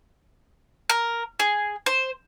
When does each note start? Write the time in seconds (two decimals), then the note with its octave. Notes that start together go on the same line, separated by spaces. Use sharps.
0.90 A#4
1.40 G#4
1.86 C5